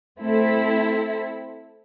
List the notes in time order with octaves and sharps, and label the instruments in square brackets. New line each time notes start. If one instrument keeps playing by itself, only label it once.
[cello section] A3 [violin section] C4 E4 A4